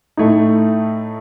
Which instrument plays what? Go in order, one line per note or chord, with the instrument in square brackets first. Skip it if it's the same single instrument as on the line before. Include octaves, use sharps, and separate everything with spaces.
[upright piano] A2 A3 D#4